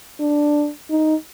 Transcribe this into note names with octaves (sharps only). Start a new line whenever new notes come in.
D4
D#4